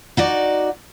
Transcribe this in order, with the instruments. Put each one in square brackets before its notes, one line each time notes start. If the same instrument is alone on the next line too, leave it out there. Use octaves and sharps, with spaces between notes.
[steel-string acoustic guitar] D#4 F#4 D5